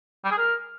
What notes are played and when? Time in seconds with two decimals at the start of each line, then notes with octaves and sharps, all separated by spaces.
0.25 G3
0.31 G#4
0.38 A#4